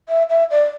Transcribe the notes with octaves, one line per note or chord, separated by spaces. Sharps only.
E5
E5
D5